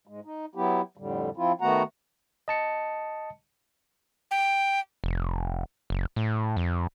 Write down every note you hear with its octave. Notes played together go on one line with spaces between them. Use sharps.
G#2 G#3
D#4
F#3 B3 E4 G4
F2 A2 D3 G3
F3 C4 E4 F4
D#3 A3 B3 F#4 F#5 A#5
D#5 A5 C#7
G5
F1
F#1
A2
F2